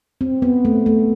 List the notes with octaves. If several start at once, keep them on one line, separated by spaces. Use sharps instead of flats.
C4
B3
A3
A3